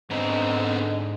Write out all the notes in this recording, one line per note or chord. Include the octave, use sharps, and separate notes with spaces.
G#2 D3 B3 C4 D#5 A#5